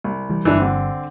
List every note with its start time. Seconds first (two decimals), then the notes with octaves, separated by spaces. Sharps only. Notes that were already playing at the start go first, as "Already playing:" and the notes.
0.04 C2
0.30 E3 G3
0.45 G1 G2 E3 D4
0.58 D3 C4